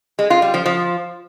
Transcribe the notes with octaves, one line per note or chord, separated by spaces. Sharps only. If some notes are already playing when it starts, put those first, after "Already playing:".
G#3
F4
G3
F3
F3